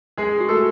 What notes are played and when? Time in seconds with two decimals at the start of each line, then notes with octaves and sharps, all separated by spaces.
0.17 G#3 G#4
0.41 F#4
0.49 A3 A4